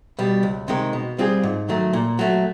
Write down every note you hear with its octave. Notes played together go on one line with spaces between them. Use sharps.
B2 G3
C#2
C3 D#3 G#3
B2
G3 C4 F4 G#4
G#2
D#3 F#3 A3
A#2
F#3 A3